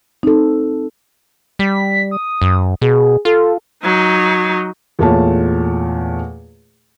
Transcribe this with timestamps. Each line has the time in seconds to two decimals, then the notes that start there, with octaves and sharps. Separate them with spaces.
0.23 C4 D#4 A4
1.59 G3 B6
2.11 D#6
2.42 F#2
2.81 B2 G#4
3.25 F4 A4
3.83 F#3 D#4
4.99 E2 A#2 A3 F4 C#5 A5